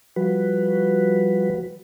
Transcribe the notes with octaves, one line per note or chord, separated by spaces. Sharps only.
F3 G3 F#4 B4